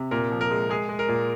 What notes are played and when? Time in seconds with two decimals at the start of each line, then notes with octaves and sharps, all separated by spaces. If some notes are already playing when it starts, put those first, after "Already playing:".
Already playing: C3
0.11 A#2 A#4
0.32 F3
0.41 A#4
0.51 G#3
0.70 G#3 G#4
0.89 G#3
0.99 A#4
1.08 A#2